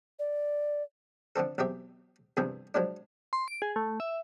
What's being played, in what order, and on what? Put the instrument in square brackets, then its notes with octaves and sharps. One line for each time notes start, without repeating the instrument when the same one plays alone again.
[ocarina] D5
[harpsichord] D3 F3 C4 A4
B1 E2 C4 G4 E5
E2 G2 C3 E3 F3
F3 F#3 G#3 D4
[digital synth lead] C6
D7
G#4
A3
E5